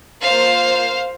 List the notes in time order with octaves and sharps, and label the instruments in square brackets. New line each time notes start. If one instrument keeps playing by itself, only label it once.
[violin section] A#3 F4 C5 F5